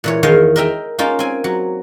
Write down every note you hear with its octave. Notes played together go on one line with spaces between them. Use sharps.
A#2 E3 C#5
E2 D#3 C#5 D#5 F5
A#4 D#5 E5 G5 A#5
A#3 C#4 D#4 F4
C4 G#5
F#3